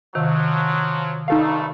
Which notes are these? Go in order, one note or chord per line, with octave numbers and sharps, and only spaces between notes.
C3 D#3 F3 F#3
G#1 G2 A3 D#4 A4 F5